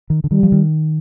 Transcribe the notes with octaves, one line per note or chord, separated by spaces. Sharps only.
D#3
D3
D#3 G3
F3
D#3